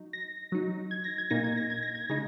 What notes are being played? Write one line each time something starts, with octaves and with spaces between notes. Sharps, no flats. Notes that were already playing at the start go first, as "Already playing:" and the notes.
Already playing: F#3 D#4
A#6
F#3 D#4
G#6
A#6
G#6
A#2 A#3 D#4 A#6
G#6
A#6
G#6
A#6
G#6
C#3 G#3 D#4 A#6